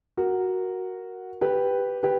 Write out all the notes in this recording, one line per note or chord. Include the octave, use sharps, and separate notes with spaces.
F#4 A#4
G4 B4
G4 B4